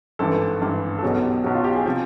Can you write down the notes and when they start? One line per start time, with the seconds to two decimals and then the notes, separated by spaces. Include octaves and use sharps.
0.19 G#1 G2 E3 A4
0.61 G#1 G2 E3
0.98 A4
1.02 B1 B2 F#3 G#4
1.23 G4
1.44 B1 B2 F#3 F#4
1.55 F4
1.64 G4
1.75 G#4
1.85 C3 F3